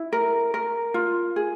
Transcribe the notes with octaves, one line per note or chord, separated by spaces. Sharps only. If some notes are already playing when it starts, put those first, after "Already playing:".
Already playing: E4
A#4
A#4
F4
G#4